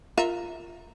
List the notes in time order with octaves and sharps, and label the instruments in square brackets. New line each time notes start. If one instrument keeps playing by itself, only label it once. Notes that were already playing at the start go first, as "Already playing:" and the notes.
[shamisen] F4 A#4 E5